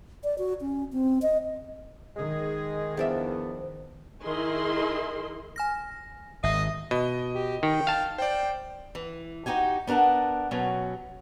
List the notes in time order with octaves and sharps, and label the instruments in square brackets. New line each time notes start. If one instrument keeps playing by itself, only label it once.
[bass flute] D5
F#4
C#4
C4
D#5
[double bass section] D#3 [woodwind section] G#3 G#4
[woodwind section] E2 B3 [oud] F3 D4 E5
[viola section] D#3 E4 G#4 A#4 D#5 C6
[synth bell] G#5 F6 A#6
[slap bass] G#1 [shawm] D#5 [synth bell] E5
[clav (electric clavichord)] B2 [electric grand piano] D#5
[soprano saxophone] G4
[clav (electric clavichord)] D#3 [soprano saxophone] G5
[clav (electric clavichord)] F5 A5
[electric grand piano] C5 D5 [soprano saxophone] G5
[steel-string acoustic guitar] E3
D#4 F#4 G4 G#5
B3 D4 A#4 F#5 A5
B2 F#3 C#4